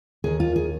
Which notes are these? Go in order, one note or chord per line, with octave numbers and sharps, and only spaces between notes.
D#2 D#3 G#4
F4
G#4